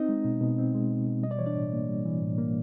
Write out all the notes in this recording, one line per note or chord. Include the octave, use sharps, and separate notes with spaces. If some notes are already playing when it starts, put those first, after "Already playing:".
Already playing: C4 D#4 D#5
G#3
B2
B2
C4
G#3
B2
B2
G3 D#5
D5
E3 C#5
D4 D5
A2
A#3
G3
E3
A2
A#3